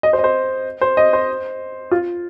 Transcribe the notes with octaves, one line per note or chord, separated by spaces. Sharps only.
D#5
C5
D#5
C5
C5
D#5
C5
F4